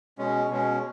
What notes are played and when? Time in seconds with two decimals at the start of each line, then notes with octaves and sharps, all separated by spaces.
0.18 B2 G#3 C#4
0.49 B2 G#3 C#4